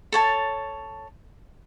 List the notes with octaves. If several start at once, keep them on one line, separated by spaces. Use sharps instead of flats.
A4 C#5 A5